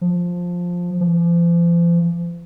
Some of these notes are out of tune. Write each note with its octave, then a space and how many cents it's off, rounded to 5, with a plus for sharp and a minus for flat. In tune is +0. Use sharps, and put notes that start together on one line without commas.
F3 +10
F3 -40